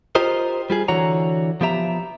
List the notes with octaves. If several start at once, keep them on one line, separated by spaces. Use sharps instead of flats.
F4 G4 A#4 C5 D#5
G3 F4 G#4
D3 E3 F#4 C#5 A#5
F3 B3 G4 E5 A#5